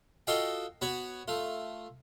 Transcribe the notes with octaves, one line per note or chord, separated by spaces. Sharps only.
F4 F#4 A4 D#5 F5 G5
B3 F#4 B4 C#5
A3 F4